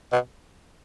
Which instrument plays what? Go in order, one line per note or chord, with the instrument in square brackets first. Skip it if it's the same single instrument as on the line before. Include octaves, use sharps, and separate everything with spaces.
[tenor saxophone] B2